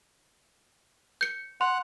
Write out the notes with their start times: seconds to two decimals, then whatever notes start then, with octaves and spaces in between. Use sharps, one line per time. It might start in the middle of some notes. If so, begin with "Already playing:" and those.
1.21 G6 C#7
1.61 F#5 C6